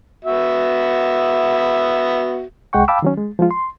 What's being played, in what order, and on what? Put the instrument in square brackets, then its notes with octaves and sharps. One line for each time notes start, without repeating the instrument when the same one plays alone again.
[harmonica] B3 F#4 E5
[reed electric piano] C2 G#3 F#5 G5 C#6
F5 G5 A5 B5 D6 E6
D#3 F#3 C#4
G#3
F3 G#3 F4
C6